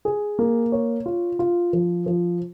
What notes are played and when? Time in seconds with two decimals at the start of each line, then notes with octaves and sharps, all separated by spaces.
0.05 G#4
0.39 A#3
0.72 C#5
1.06 F4
1.39 F4
1.73 F3
2.06 F3